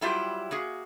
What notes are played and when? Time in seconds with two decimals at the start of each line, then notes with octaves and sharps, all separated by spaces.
0.01 F#3 G3 E4 F4 G4
0.51 A#3 F#4 G#4